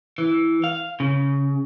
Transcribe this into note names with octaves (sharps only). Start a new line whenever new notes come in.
E3
F5
C#3